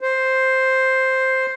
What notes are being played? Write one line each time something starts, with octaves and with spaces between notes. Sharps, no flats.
C5